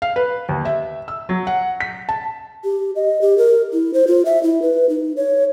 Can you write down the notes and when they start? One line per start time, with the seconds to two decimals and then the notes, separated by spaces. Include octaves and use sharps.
0.02 F5
0.16 B4
0.49 D#2
0.65 E5
1.08 E6
1.29 F#3
1.47 F#5
1.80 B6
2.09 A5
2.64 G4
2.96 D#5
3.22 G4
3.38 A#4
3.73 E4
3.94 C5
4.07 F4
4.25 E5
4.43 E4
4.62 B4
4.89 D#4
5.17 C#5